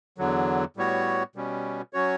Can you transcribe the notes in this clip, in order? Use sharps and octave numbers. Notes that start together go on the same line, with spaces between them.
E2 D3 F#3
A2 G3 B3 F#4 C#5
B2 G3 C#4
F#3 C#4 F#4 C#5